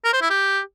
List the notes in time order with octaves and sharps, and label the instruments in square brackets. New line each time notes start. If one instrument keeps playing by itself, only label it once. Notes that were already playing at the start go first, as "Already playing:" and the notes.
[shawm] A#4
C5
E4
G4